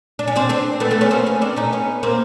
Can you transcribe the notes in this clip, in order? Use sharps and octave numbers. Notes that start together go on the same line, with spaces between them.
D4
C#4
C4 D4
C4 D4
A3 B3
A3 B3
B3 C#4
A#3 C4
B3 C#4
C4 D4
C#4 D#4
B3 C#4
A#3 C4